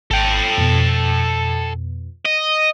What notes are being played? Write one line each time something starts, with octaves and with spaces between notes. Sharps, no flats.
G#1 A4 G5
F2 B2
D#5